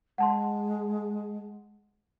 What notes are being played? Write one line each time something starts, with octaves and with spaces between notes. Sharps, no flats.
G#3 F#5 A5 C6